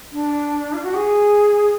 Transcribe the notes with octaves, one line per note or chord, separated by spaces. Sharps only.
D4
F4
F#4
G#4